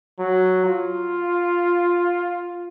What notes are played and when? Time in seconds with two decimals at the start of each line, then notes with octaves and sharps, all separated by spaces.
0.19 F#3
0.66 F4